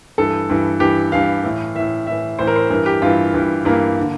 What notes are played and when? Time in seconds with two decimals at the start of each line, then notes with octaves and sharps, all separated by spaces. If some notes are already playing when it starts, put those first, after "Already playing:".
0.18 G2 E3 A4
0.49 G2 E3
0.80 G2 E3 G4
1.12 G2 E3 F5
1.44 A2 E3
1.75 A2 E3 E5
2.07 A2 E3 E5
2.39 A2 E3 C5
2.47 A#4
2.56 C5
2.70 G2 E3 A#4
2.86 G4
3.02 G2 E3 F4
3.34 G2 E3
3.65 G2 E3 A#3
4.00 D3